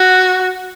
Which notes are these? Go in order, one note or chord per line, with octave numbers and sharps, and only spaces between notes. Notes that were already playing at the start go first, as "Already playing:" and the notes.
Already playing: F#4